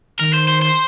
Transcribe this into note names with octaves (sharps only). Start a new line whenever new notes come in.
D#3 A#4
C5
C5
C5